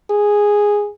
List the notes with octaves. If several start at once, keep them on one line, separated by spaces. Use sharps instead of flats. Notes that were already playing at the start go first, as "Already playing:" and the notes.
G#4